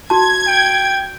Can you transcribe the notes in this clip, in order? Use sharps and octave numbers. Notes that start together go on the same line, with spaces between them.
F#4 A5 G#6
G5